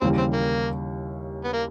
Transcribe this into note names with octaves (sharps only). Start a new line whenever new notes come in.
D#2 C#3 E3 G3 C4
C4
A#3
B3
A#3